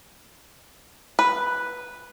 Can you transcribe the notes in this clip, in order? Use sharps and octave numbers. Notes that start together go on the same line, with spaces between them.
B4